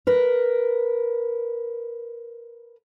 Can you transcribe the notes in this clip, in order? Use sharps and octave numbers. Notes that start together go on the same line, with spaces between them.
A#4 B4